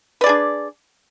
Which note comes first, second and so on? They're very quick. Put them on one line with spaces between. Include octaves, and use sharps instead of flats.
B4 D5 G#4 D4